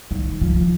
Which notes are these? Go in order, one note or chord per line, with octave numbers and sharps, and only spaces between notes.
D#3
F3